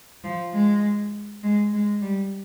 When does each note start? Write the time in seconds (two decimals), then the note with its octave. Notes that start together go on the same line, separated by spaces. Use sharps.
0.24 F3
0.54 G#3
1.44 G#3
1.73 G#3
2.02 G3